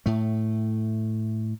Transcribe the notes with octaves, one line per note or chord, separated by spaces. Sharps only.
A2 A3